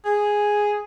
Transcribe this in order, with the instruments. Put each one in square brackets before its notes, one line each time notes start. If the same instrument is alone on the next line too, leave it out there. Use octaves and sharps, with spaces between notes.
[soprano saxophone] G#4